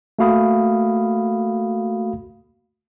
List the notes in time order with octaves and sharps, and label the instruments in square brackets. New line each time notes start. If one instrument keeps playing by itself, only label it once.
[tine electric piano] A3 A#3 F#4 F5 B5 D#6